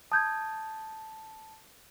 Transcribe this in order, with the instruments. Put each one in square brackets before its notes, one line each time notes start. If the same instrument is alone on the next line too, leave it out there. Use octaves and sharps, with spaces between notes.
[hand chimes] A5 [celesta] D#6 G6 G#6